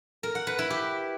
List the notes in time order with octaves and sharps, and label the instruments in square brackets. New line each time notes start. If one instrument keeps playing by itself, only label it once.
[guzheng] A#4
F#5
B4
E4
G4